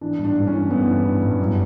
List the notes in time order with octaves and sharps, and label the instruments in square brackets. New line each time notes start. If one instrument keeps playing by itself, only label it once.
[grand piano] E3 D4
G2
D4
G2
C#4
E3
G2 B3
E3
G2
G2
F#2